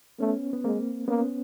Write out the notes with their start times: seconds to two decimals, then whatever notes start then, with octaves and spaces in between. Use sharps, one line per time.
0.19 A3 B3 C#4
0.53 B3
0.64 G#3 A#3 C4
1.08 A#3 B3 C#4